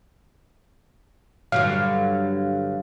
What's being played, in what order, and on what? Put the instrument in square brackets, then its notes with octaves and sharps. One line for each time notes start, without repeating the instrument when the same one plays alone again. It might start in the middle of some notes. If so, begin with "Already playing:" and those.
[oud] G2 D3 F#3 [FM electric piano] F5